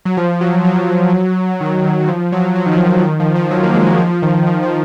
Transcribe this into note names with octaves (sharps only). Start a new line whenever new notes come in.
F#3
F3
F#3
F#3
D#3
D#3
F3
F#3
F#3
D#3
F3
F3
D#3
F3
F3
F#3
A#3
G#3
D#3
F3
D#3
F3
F3